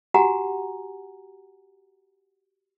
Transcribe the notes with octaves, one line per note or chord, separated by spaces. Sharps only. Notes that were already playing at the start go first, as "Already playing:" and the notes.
F#4 G4 F#5 G#5 A#5